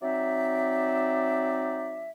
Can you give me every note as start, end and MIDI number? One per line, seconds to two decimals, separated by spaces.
0.03 2.11 54
0.03 2.11 60
0.03 2.11 63
0.03 2.11 74
0.03 2.11 76